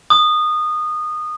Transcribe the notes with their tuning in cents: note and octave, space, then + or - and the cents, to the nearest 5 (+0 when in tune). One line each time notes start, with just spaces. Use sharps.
D#6 -20